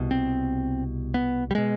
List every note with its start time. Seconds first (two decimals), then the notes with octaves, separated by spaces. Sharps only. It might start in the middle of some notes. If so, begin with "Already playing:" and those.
Already playing: C2 B2
0.11 C4
1.14 B3
1.51 G3
1.55 B2 G#3